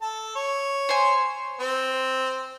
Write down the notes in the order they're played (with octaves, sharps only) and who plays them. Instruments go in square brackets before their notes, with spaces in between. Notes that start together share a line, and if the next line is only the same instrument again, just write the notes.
[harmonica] A4 A5
C#5
[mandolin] C5 G#5
[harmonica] C4